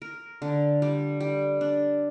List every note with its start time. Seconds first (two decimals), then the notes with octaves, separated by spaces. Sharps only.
0.02 A#4
0.42 D3
0.82 G3
1.20 G3
1.61 D4